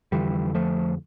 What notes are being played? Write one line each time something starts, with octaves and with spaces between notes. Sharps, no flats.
F2 D3 E3 G3
F3 A3